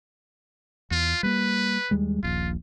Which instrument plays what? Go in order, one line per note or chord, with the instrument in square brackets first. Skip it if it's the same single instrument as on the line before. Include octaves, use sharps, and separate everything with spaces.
[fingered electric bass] E2 [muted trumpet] F4
[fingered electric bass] G3 A#3 [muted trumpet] B4
[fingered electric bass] D#2 G3 G#3
[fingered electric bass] D#1 A#1 [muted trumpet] F4